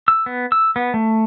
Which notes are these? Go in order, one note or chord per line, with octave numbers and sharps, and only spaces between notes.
E6
B3
E6
B3
A3